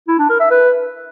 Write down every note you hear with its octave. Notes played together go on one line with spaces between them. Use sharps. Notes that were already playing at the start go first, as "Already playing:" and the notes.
E4
D4
A#4
E5
B4